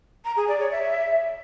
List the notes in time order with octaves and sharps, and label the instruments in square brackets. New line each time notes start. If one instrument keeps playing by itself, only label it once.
[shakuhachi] A#5
G#4
D5
C#5
E5